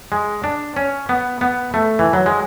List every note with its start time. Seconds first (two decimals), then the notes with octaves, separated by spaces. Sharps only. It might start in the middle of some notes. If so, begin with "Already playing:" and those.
0.12 G#3
0.44 D4
0.76 C#4
1.09 B3
1.41 B3
1.74 A3
1.99 E3
2.13 F#3
2.26 G#3